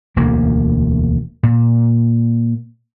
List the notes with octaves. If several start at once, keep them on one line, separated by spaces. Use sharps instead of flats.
E1 D2 A#3
A#2